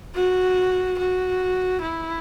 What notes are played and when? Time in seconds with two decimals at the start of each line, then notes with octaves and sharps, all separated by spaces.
0.15 F#4
0.98 F#4
1.82 E4